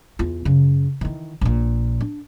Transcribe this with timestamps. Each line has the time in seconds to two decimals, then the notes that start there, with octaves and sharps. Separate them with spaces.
0.19 E2 F4
0.45 F#2 C#3
1.01 D#3 E3
1.41 A#1 A#2
2.01 D4